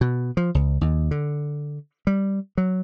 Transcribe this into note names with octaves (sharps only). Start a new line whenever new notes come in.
B2
F3
C#2
D#2
D3
G3
F#3